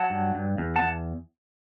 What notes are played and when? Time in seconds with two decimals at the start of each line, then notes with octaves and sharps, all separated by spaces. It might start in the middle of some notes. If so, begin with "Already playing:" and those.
Already playing: F#3 F#5 A5
0.10 G2
0.35 G2
0.58 E2
0.76 F#5 A5
0.81 E2